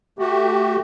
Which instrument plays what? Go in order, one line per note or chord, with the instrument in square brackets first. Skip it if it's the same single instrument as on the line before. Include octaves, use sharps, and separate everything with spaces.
[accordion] A3 F#4 G4